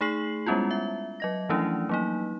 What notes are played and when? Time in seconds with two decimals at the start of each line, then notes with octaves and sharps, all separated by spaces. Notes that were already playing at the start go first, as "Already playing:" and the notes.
0.01 A3 D#4 G#4 C7 F#7
0.46 G3 G#3 B3 C#4 E4 F4
0.71 E5
1.20 F#3 D#5 A#6
1.49 E3 F3 A3 C#4 D4 E4
1.89 F#3 A#3 D#4